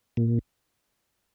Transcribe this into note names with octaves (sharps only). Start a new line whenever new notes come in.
A#2